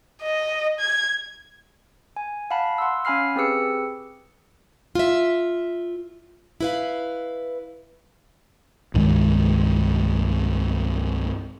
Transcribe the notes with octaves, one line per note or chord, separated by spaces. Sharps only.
D#5
G#6
G#5
F5 F#5 A5 B5
F#5 C6 E6
C#4 F5 G#5 B5 F6 C7
C4 G4 G#4 B4 E6 C#7
F4 E5
E4 B4 F5
C2 G2 D#3 G#3